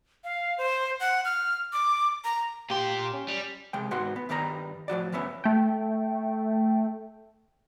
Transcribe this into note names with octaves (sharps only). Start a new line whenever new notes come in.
F5
C5
F#5
F6
D6
A#5
A#2 G4 C6
C#4
G3
C3 G#3 G5
G#2 B3 F#4 F#5 C6
B3
G2 D#3 G3 B3 A#4 A#5
A2 F3 F#4 D5
D2 G2 B3 C#4 E5
A3 G5